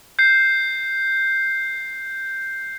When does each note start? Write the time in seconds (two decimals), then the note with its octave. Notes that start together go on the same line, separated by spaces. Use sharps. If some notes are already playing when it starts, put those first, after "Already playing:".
0.19 G6 C7